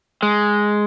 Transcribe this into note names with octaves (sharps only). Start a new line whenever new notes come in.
G#3